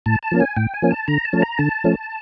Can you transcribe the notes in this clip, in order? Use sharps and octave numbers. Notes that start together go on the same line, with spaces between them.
A2 A5
A5
F3 A#3 C#4
G#5
A2 G5
G#5
F3 A#3 C#4
A5
D3 A#5
A5
F3 A3 C#4
A#5
D3 A5
F3 A3 C#4